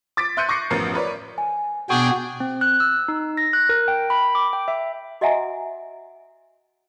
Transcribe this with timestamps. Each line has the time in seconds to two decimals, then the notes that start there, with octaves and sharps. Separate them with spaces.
0.17 D6 A6 B6 D7
0.37 E5 C6 F#6 G6 C#7 D#7
0.49 C#6 D6 A#6 C7 C#7
0.70 A1 F#2 F3 B3 A#4 C7
0.94 A#4 B4 C#5 D5
1.38 G#5
1.90 B2 B3 D4 G#4 G5 C#6
2.40 C4
2.61 F#6
2.80 E6
3.08 D#4
3.37 A#6
3.53 F#6
3.69 A#4
3.88 G5
4.10 B5
4.35 D6
4.53 G5
4.68 E5
5.21 F#4 D#5 E5 F#5 G#5 A#5